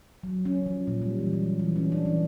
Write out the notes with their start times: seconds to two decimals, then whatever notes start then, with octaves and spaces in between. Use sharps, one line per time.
0.23 F#3
0.45 C#4
0.66 F3
0.87 A#2
1.02 G3
1.19 E3
1.33 F#3
1.59 E3
1.76 C#4
1.92 D4
2.05 E3